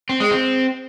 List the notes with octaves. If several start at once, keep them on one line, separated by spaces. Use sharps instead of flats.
C4
G#3
C4